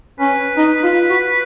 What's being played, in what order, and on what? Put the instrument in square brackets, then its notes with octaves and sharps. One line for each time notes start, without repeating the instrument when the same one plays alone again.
[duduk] C#4 [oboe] B4
[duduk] D#4
F4
F#4